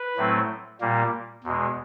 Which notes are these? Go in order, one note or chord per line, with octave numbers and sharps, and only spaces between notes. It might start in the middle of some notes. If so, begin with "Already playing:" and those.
Already playing: B4
A2 F#3 A3 C4
A#2 G3 A#3
E2 B2 G#3